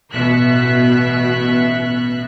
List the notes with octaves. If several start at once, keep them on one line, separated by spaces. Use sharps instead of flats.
A1 B2 E5 F#6